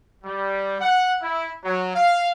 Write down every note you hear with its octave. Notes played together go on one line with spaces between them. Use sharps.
G3
F#5
E4
F#3
F5